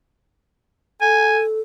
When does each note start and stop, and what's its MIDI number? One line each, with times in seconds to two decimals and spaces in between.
1.01 1.61 69
1.01 1.41 80